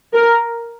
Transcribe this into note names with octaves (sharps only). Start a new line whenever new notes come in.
A#4